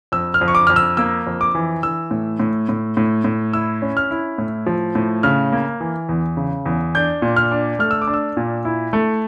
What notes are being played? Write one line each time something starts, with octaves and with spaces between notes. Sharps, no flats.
F2 E6
F6
F2
C#6
D6
F2 F6
E6
A#3 E6
F2
D6
E3
E3 E6
A2
A2
A2
A2
A2
E4 E6
C#4
F6
E4
A2
F3
A2
C#3 F6
A#3
E3
E2
C#3
E2
D4 G6
A#2
F6
D4
A3 F6
E6
D6
D4
E6
A#2
E4
A3